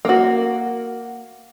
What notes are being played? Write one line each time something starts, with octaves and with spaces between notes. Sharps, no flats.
A#3 F#4